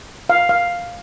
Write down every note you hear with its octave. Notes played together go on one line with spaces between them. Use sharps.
F5
F5